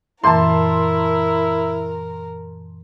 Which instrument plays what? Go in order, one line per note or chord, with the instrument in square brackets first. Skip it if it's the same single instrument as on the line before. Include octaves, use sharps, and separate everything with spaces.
[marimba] F#2 A#2 E3 [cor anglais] E4 [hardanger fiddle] A#4 [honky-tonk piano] A5 C6